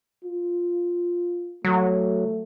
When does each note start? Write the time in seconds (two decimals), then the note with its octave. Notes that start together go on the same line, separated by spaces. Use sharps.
0.24 F4
1.65 F#3 A3